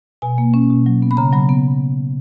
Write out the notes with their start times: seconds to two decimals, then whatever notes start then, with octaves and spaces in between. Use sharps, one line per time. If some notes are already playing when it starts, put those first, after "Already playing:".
0.22 B2 G#5
0.38 A#3
0.54 C#4
0.70 B2
0.86 F#3
1.02 B3
1.11 B5
1.17 C#3 A#5
1.33 F#3 B5
1.49 B3